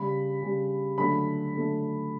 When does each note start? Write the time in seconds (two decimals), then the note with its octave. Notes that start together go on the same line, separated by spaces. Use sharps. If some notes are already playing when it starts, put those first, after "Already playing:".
Already playing: C#3 G3 B5
0.41 C#3 G3
0.98 D3 F#3 A3 B5
1.54 D3 F#3 A3